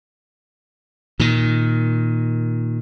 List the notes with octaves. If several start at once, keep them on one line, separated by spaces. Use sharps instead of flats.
A#2 D#3